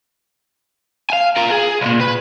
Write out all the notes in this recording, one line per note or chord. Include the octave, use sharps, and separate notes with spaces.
F5 G#5
F4 A#4
G#4
C2 A#2
B4